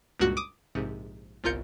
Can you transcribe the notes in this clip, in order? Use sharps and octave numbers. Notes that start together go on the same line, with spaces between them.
C#2 G2 A#2 F#4 F#6 C#7
D6 D#6
A#1 G#2 C3
G1 C2 F4 A#4 G6 C#7